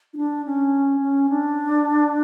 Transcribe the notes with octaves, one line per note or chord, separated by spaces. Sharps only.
D#4
D4
C#4
C#4
D4